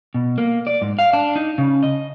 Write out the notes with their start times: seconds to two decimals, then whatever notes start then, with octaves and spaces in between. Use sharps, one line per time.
0.14 B2
0.38 A#3
0.67 D5
0.82 G#2
0.99 F5
1.13 D4
1.36 D#4
1.58 C#3
1.83 D#5